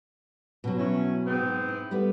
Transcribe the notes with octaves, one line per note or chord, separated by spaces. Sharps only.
B2 F#3
C#4 E4
G#2 B3 C4
E4
G3 A3 B3